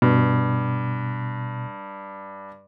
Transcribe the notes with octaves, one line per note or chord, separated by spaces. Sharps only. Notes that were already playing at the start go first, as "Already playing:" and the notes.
G2 B2